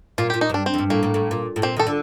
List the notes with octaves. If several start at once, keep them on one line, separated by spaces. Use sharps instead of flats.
A#2 F4
G4
A#2
D#4
G2 D4
C4
F2
G2
A2 A#3
A2
A2
A#2
A2
A#2 C4
D#3 A4
D3